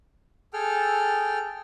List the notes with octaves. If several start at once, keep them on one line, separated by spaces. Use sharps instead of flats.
G#4 A4 G5 F6